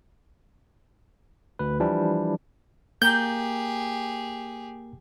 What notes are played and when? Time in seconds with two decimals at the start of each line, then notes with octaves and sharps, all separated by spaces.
1.59 D2 B4
1.80 E3 F3 G3 D4 E4
3.02 A#3 G4 G#4 A#4 A#5 G6